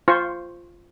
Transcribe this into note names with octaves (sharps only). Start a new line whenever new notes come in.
F4 C5 C#6